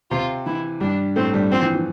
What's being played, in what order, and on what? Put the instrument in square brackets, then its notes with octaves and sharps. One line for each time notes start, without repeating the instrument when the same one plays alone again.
[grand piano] C3 C4 [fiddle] F4
[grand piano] E3 [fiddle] E4
[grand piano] G2 G3 [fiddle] D4
[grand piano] A2 A3 [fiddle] C4
[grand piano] G2 G3
[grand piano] F3 [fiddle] C4
[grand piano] E3
E3